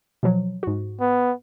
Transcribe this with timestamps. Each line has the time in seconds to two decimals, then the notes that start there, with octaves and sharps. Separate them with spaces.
0.23 B2 F3 F#3
0.63 G#2 F#4
1.01 B3